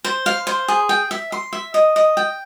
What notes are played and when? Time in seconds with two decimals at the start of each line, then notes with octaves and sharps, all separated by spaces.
0.05 C5
0.26 F5
0.47 C5
0.68 G#4
0.89 G5
1.11 E5
1.32 C6
1.53 E5
1.74 D#5
1.96 D#5
2.17 G5